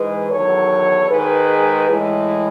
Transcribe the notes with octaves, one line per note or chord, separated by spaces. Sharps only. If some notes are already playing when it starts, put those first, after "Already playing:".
Already playing: G#2 E3 G#3 G#4 B4
E2 D#3 F#3 A4 C#5
G#2 D#3 G#3 G#4 B4
A2 E3 G#3 E4 G#4